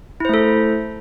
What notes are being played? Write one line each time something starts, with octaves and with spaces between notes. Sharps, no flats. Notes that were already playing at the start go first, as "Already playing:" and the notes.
A3 E4 A4 C5